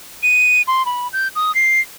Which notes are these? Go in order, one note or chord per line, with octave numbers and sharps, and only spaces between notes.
D#7
C6
B5
G6
D#6
C7